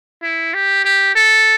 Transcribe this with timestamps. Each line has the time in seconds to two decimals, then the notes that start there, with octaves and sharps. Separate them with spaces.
0.23 E4
0.54 G4
0.84 G4
1.15 A4